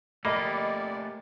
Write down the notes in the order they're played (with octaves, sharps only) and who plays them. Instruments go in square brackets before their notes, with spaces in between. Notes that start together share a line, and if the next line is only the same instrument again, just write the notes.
[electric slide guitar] A3 G4 [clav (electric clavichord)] A#3 [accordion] D5 [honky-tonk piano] D#5 B5 A#6